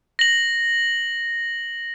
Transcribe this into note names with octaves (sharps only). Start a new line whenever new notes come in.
A#6 F#7